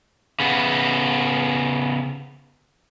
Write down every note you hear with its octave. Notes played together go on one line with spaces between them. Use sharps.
C#3 B3